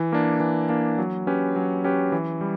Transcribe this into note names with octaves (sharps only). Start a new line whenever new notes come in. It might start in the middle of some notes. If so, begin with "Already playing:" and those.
Already playing: E3
A#3 D4
E3
A#3 D4
F#3
C#4 G4 B4
F#3
C#4 G4 B4
E3
G3